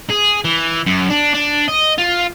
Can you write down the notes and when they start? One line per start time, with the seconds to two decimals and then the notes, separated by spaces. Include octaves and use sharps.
0.10 G#4
0.44 E3
0.86 F#2
1.10 D4
1.35 D4
1.69 D#5
1.98 F4